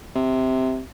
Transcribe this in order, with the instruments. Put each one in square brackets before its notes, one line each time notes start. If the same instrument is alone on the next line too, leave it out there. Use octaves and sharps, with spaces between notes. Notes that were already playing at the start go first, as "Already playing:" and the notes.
[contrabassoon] C3